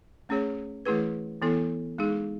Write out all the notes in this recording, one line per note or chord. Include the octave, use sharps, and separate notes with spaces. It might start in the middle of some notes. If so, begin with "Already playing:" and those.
A3 C#4 G#4 C#5
E3 A3 E4 G#4 B4
E3 B3 E4 A4
G#3 D#4 G#4